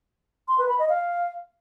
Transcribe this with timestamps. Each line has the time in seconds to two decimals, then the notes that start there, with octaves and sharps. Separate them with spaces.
0.48 C6
0.58 B4
0.69 B5
0.79 D#5
0.89 F5